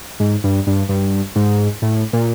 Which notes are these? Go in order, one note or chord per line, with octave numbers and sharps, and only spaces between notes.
G#2
G2
G2
G2
G#2
A2
A#2